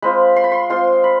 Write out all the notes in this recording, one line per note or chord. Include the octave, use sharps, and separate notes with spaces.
G#3 C4 F4 B5
C6
B5
C6
G#3 C4 F4 C6
B5